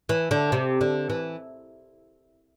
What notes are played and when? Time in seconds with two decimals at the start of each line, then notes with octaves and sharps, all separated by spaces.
0.09 E3
0.31 D3
0.52 C3
0.81 D3
1.10 E3